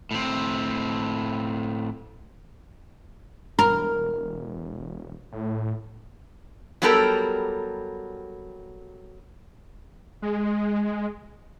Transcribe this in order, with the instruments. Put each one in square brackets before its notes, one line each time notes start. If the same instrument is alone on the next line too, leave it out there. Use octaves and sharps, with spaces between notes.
[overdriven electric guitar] A2 C4
[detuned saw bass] E1 [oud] A#4
[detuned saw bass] A2
[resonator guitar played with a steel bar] F#3 G3 B3 G4 A4 A#4
[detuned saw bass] G#3